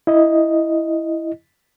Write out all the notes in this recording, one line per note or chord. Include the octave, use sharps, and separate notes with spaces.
E4 D#5